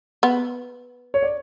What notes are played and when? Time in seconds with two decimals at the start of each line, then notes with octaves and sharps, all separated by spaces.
0.23 B3
1.14 C#5
1.23 D5